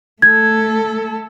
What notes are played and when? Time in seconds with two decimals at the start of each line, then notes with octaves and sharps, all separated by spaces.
0.22 A3 A4 G#6